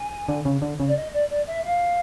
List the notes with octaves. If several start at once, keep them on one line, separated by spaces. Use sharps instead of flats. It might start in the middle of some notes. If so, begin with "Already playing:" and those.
Already playing: G#5
D3
C#3
D3
C#3
D5
D#5
D5
D5
E5
F5